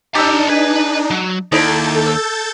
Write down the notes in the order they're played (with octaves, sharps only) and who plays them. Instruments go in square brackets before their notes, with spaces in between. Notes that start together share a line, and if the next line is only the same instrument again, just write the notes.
[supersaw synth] D4 D#4 [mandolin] G4 E6 [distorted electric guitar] A4 A#5
[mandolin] G#4 [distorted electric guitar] B4
[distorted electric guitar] F#3
[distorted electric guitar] D#2 [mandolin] D#4 E4 D5 [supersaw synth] A4 G6 A6
[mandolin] E6